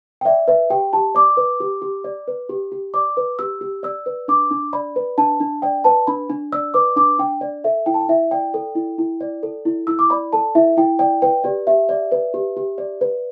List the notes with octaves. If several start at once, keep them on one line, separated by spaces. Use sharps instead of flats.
G5
D5 E5
B4 E5
G4 G5
G4 A5
D5 D6
B4
G4
G4
D5
B4
G4
G4
D5 D6
B4
G4 E6
G4
D5 E6
B4
D4 D6
D4
D5 B5
B4
D4 A5
D4
D5 G5
B4 A5
D4 B5
D4
D5 E6
B4 D6
D4 D6
D4 G5
D5
A4 E5
E4 G5
A5
G5
E4 E5
D5 G5
A4
E4
E4
D5
A4
E4
E4 E6
D6
D5 B5
A4 A5
E4 E5
E4 G5
D5 G5
B4 G5
G4 D5
G4 E5
D5
B4
G4
G4
D5
B4